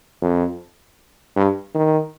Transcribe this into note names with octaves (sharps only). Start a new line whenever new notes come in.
F2
G2
D#3